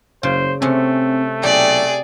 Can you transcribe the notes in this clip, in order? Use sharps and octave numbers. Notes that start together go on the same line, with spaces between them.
F#1 C#3 C5
C3 A3 C4 C#4
B1 G4 G#4 D5